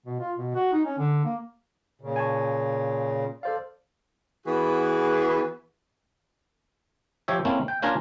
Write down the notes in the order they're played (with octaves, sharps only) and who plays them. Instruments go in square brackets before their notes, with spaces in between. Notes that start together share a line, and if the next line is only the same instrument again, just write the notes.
[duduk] B2
F4
B2
F#4
D#4
C#4
D3
A#3
[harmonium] A#2 C#3
[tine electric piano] G#5 A5 C#6
[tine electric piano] A4 C5 F5 [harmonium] D5
[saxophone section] E3 B3 F#4 G#4
[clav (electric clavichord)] F3 G4 C#5 E5
A#3 C4 C#4 E4 A4
G5
A#3 C#4 D4 F4 A#4 G#5